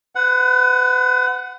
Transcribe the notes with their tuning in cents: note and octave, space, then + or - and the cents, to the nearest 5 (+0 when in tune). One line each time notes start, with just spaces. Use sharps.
B4 +40 F#5 +0